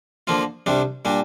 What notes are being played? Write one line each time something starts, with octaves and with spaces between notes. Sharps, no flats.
D3 F3 A#3 F4
C2 C3 G3 D4
A#2 G3 D4